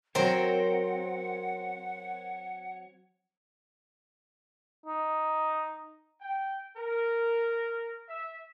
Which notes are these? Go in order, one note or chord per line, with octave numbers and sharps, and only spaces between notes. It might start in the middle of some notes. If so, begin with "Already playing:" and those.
F#3 C4 A#4 C5 C#5 F#5
D#4
G5
A#4
E5